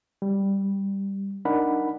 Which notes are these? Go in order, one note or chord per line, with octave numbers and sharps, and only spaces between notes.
G3
D4 D#4 A#4 F#5 B5